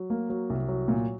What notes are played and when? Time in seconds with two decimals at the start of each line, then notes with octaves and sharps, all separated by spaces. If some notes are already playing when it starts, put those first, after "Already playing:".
Already playing: F#3
0.10 A#3
0.30 F#3
0.50 C2
0.68 F#3
0.88 A#2